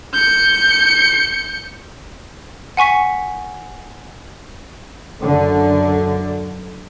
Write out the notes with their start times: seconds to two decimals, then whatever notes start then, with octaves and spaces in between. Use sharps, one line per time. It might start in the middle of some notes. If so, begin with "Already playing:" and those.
0.13 G6 C#7
2.77 F#5 G#5 C#6 B6
5.21 F#2 D3